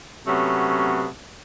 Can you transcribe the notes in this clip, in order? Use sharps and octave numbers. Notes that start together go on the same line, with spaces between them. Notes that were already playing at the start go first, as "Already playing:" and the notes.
C3 F#3 A3 B3 C#4